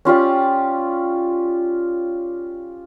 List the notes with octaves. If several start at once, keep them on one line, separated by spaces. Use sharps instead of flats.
C#4 F4 G4 D5